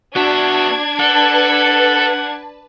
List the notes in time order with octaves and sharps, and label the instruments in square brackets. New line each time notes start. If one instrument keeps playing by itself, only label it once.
[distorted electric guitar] B3 E5 [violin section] D4 G#6 [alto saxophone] F#4
[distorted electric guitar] A4 [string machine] B4 A5 [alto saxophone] F#5